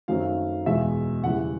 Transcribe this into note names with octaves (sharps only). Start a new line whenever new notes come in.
F#2 D#3 F#3 A3 C4 F5
E2 B2 G#3 E5
E2 C#3 E3 G3 F#5